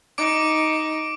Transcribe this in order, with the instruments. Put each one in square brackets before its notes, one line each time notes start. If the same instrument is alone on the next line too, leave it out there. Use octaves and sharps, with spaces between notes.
[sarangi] D#4 [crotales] D6 D7